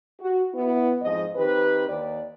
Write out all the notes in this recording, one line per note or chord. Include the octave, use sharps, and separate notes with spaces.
F#4
B3 E4
F2 G#2 F3 D#5
D#3 C4 G4 B4
D#2 D#3 D5